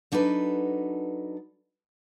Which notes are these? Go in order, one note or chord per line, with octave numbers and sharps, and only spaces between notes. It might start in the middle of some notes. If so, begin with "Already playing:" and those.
F#3 D4 D#4 A4 B4